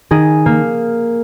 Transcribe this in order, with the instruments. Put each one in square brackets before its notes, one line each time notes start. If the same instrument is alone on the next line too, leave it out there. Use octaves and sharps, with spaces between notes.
[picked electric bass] D#3 [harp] G#4
[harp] A#3